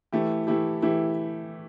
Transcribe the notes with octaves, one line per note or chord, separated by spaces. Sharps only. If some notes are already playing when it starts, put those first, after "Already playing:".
E3 A3 E4 G4
E3 A3 E4 G4
E3 A3 E4 G4